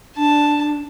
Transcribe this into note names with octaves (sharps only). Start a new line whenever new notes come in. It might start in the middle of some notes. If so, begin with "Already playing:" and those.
D4 A5